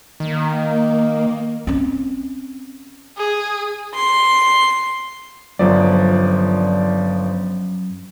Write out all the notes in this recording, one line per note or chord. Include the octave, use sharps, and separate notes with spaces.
D#3 A#3
C4 C#4
G#4
C6
G1 F#2 F3 D5